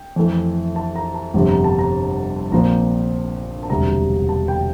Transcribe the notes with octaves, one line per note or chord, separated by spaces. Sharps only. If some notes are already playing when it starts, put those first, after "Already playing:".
Already playing: G5
F2 E3 A3
A5
A#5
A5
G1 F2 C3
A#5
A5
A#5
A#1 A#2 F3 C4 A#5
A5
E1 D2 C3 G3 A#5
A5
G5